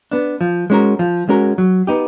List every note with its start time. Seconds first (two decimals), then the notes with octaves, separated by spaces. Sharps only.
0.11 B3 D4
0.41 F3
0.70 G#3 C#4 F#4 A#4
0.99 F3
1.29 G#3 C#4 F#4 A#4
1.58 F#3
1.87 B3 D#4 G4